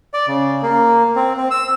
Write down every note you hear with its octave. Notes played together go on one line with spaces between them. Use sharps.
D5
C#3
A#3
C4
C4
E6